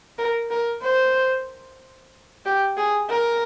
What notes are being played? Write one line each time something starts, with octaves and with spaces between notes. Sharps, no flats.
A#4
A#4
C5
G4
G#4
A#4